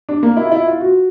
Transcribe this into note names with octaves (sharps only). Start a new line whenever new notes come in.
D4
A#3
E4
F4
E4
F4
F#4